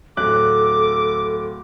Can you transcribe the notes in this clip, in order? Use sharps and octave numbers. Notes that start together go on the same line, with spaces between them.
D1 A4 D6 F#6